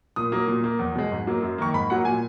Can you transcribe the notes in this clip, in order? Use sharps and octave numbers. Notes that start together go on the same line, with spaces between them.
A#2 D#6
F#3 A#3
A#2
A#3
E2
B2 G#3
G#2
F#3 A#3
F#2
D#3 A#3 C#6
G#2 B5
F#3 A#3 F#5
A#2 G#5